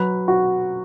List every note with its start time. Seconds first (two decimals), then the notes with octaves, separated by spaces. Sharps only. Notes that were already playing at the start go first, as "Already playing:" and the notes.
Already playing: F#3 B4
0.28 F#4